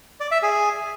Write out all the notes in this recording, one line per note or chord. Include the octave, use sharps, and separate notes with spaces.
D5
E5
G#4